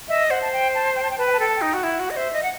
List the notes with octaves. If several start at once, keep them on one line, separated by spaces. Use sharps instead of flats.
D#5 E5
C5 F#5
A5
G5
A5
G5
A5
G5
B4 A5
G5
A5
A4 G5
A5
G5
D#4
F#4
E4 F#5
F#4
D#5
C5 E5
D#5
F#5